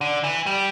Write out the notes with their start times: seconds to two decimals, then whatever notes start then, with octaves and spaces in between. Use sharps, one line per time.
0.01 D3
0.24 E3
0.46 G3